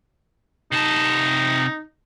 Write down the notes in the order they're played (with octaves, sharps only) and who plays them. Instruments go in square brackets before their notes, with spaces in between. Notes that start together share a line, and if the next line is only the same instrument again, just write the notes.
[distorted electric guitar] C3 A5 [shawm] D#4